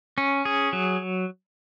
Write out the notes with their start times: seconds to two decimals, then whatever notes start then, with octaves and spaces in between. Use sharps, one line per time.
0.18 C#4
0.45 G#4
0.73 F#3